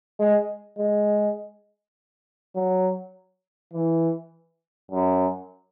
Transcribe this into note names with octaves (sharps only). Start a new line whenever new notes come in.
G#3
G#3
F#3
E3
F#2